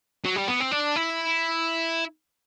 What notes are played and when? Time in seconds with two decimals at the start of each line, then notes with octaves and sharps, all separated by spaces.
0.25 F#3
0.36 G3
0.48 B3
0.60 C4
0.72 D4
0.96 E4